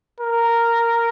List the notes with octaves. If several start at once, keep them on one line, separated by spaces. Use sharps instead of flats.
A#4